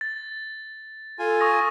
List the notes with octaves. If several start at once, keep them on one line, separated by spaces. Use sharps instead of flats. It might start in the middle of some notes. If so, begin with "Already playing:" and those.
A6
F4 A4 G#5
C#6 D#6 A#6